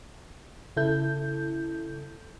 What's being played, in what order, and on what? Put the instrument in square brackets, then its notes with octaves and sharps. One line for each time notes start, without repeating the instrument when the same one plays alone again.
[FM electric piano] C#3 E4 A4 G6